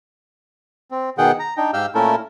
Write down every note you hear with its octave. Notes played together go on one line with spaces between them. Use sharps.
C4
B2 D#3 G#4 F#5 G5
A#5
D4 D#4 G5
G#2 G4 F5 E6 F6 G6
A#2 A3 C#4 E4 A4 A#4